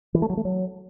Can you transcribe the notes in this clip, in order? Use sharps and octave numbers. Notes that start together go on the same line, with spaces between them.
E3
A3
F#3
A3
F#3